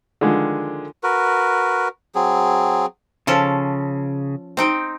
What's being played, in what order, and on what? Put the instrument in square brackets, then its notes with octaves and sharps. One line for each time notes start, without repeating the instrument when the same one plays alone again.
[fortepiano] D3 D#3 F3 G#3
[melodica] F#4 A#4 B4
F#3 C4 G#4
[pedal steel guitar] C#3 [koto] F3 C#4 A4
[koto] C4 D#4 G5